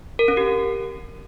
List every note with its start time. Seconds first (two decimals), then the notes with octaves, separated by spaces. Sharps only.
0.19 A#4
0.28 C#4
0.37 G4